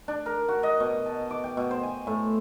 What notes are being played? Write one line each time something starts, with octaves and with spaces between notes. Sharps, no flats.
D4
A#4
F#4
D#5
B2
A5
D6
G5
B2
C5
G#5
A2